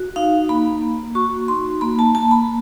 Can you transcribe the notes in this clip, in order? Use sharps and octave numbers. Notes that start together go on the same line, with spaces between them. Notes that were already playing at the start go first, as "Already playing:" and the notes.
Already playing: F#4
D#4 F5
A#3 B5
A#3
F#4 C#6
D#4 C6
A#3 B5
A5
A#3 A5
B5